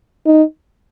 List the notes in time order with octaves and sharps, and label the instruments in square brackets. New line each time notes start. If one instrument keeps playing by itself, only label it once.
[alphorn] D#4